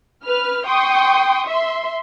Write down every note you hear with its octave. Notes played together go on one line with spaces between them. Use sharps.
B4 F6
G5 C6 C#6 D#6
E5 C6